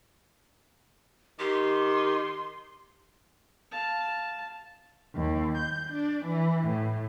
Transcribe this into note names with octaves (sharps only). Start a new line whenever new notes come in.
D#3 G4 C6
F5 A5
D#2
G6
D4
E3
A2